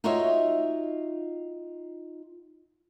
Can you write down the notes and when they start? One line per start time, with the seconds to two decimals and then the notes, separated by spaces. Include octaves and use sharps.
0.04 D#4 F4 F#4 C#5 D#5 E5